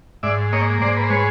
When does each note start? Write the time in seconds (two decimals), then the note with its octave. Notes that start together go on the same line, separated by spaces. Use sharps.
0.23 G#2 D5 E5
0.53 A#3 C#5 D#5
0.81 G#2 C5 D5
0.97 B4
1.04 C5
1.10 G#3 B4 C#5